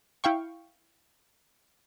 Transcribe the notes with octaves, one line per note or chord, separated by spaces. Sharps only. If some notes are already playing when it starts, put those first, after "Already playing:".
E4 F5 G5 C#6